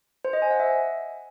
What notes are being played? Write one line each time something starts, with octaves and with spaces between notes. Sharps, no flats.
C5
D#5
G#5
F#5
E5